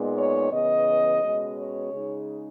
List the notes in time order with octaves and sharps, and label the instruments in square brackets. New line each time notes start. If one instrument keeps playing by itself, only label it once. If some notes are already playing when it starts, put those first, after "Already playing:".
Already playing: [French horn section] A#2 G#3 B3 D#4
C#5
C#3 E3 B3 D#5
B2 G#3 C#4
C#5
C#3 G#3 D#4